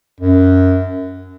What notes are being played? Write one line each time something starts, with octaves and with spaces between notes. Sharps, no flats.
F#2